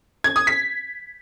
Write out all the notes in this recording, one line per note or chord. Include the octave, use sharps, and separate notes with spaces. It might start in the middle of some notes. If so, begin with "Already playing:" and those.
G#6
D#6
B6